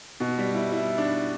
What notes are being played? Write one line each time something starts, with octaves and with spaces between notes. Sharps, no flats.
B2
G3
E4
E4
D4